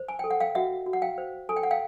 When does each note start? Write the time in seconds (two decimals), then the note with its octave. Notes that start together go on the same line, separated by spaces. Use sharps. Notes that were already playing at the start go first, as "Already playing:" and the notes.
Already playing: C5
0.08 G#5
0.19 A4 G5
0.31 F#5
0.40 F5 G5
0.55 F#4 E5 F#5
0.86 F#4
0.93 F#5
1.02 F5 G5
1.18 C5
1.49 A4 G#5
1.56 G5
1.63 F#5
1.71 F5 G5